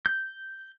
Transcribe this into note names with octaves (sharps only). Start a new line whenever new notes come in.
G6